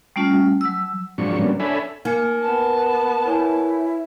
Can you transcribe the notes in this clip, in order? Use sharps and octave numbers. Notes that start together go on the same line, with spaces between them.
G3 A3 C#4 F4
F#3 E6
G#2 F3 F#3 C4 D4 C#6
F#3 G3 A#3 B3 C#4 D4
D4 A4 C#5 E5 G#5 B5
A#3 D#4 G#5 C#7
B3 A5
E4 B4 C#5 G#5